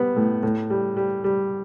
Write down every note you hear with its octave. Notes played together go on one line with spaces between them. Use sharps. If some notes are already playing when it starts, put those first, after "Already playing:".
Already playing: G3 B3
A2
A2
G3
G3
G3